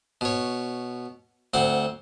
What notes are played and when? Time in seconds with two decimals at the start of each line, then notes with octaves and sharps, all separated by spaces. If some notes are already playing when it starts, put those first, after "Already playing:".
0.21 B2 C#5
1.54 D2 C4 F#5